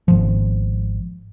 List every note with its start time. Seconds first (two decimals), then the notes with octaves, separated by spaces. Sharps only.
0.08 G#1 F3